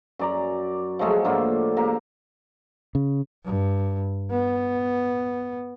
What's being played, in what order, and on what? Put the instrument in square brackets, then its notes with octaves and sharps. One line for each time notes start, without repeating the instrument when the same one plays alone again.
[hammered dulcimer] F#2 D5 A#5
F3 F#3 G#3 A3
A2 D3 A#3 F4
A#3 G4 A#5
[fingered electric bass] C#3
[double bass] G2
B3